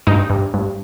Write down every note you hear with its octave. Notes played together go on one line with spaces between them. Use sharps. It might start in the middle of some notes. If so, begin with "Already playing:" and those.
G2 D#4
G2
G2